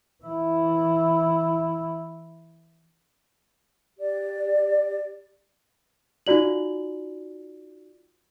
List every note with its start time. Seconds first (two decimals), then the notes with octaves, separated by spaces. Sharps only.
0.24 E3 E4
3.98 G4 D5
6.27 D#4 F4 F#4 D5 F#7